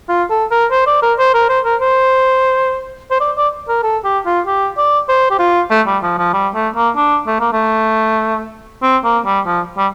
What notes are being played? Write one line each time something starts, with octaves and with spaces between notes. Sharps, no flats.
F4
A4
A#4
C5
D5
A#4
C5
A#4
C5
A#4
C5
C5
D5
D5
A#4
A4
G4
F4
G4
D5
C5
G4
F4
A3
G3
F3
F3
G3
A3
A#3
D4
A3
A#3
A3
C4
A#3
G3
F3
G3